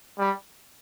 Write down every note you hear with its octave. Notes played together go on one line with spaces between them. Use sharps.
G3